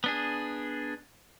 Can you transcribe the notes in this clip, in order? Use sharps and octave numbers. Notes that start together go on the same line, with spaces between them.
B3 D4 G#4